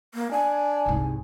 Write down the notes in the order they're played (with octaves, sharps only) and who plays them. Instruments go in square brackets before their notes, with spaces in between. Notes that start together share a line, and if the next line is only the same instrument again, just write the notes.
[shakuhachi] A#3
[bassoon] D4 [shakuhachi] G#5
[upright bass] C2 G#2